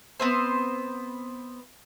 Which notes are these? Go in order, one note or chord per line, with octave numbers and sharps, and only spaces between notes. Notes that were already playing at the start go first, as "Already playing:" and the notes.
B3 C4 C5